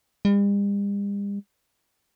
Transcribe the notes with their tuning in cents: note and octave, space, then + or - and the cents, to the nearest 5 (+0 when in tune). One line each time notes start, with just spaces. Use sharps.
G3 +45